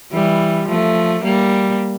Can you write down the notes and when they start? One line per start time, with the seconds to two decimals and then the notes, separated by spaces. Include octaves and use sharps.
0.12 E3 G3
0.68 F3 A3
1.24 G3 A#3